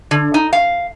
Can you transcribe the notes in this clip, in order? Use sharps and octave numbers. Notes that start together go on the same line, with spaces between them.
D3
D#4
F5